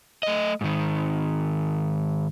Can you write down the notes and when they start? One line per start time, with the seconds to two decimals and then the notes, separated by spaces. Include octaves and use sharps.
0.23 A3 D#5
0.61 G#2 D#3